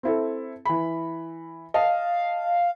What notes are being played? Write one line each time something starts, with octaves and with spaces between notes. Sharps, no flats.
C4 E4 A4
E3 B5
D#5 F5 A5